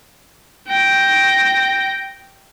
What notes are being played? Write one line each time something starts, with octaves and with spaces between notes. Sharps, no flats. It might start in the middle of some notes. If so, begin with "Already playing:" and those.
G5 A#6